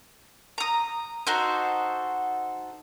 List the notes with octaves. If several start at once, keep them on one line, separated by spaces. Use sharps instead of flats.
A#5 D#6
D#4 F#4 A4 C5